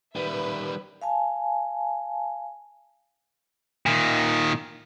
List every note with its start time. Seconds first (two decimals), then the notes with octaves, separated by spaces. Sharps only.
0.15 D#3 G3 B4 E5
1.02 F5 G#5 A5
3.86 A#2 D#3